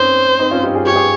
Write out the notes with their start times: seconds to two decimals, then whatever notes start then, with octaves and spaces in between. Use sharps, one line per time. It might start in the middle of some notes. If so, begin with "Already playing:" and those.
Already playing: C4 C#4 D#4 C5
0.39 C4 D#4
0.51 C#4 F4
0.63 D#4 G4
0.75 F4 G#4
0.86 G4 C#5
0.96 G#4